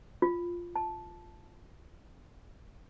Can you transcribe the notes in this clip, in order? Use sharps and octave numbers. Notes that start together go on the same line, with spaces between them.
F4
A5